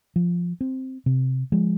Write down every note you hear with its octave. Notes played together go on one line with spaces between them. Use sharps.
F3
C4
C3
F3 G#3